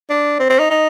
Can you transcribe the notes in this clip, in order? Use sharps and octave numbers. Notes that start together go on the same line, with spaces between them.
D4
C4
C4
D#4
D#4